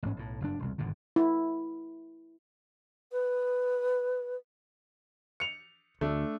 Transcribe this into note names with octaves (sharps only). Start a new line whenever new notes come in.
A1 G#2 C#4
B1 A2
F#1 G2 D4
E1 C2
G#1 G2 A#2 D3
E4
B4
C#7 F7
D2 A3 D4